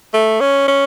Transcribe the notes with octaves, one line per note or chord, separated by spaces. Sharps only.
A3
C#4
C#4